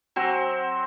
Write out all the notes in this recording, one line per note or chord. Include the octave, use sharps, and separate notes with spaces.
F#3 C4